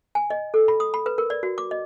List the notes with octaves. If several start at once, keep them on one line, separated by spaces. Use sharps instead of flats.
G#5
D#5
A4
B5
D#6
B5
B4
A#4
D5
F#4
D6
D#5